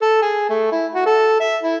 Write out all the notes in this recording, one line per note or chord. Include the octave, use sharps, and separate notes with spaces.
A4
G#4
A3
E4
F#4
A4
E5
E4